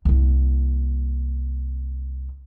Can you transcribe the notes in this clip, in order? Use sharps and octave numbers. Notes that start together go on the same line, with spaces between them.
C2 A#3